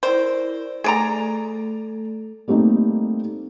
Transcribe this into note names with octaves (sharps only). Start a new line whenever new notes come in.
E4 A#4 C5 D5
A3 G#4 A4 D5 A#5
G3 A3 A#3 C4 D#4